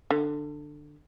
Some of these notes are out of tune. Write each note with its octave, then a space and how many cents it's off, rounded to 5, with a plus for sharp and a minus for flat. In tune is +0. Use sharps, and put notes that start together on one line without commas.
D3 +15